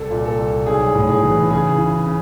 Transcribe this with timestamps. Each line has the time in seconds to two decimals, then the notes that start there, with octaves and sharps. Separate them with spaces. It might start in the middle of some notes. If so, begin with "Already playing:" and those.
Already playing: C2 A4
0.10 A#2
0.25 A4
0.39 C2
0.66 B1 G#4
0.95 A2
1.09 G#4
1.23 E3
1.50 C#3 G#4
1.78 E3
2.07 C#3